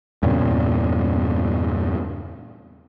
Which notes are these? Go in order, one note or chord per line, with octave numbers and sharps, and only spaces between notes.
E2 G2 A#2 C#3